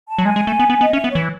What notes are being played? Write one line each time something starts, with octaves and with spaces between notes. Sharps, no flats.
A5
F#3
G#3 G#5
G#3
A3
B3
B3
B3 D#5
C#4 E5
B3
C#5
E3